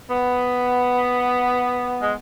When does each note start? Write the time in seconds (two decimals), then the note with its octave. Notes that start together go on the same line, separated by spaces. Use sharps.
0.09 B3
2.01 G#3